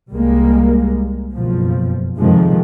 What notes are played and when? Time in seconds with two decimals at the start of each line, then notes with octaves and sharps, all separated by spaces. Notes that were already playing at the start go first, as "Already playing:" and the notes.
0.11 C2 G3 G#3 A#3
1.33 F#1 F2 B2 F3
2.18 F2 C3 D#3 F3 G#3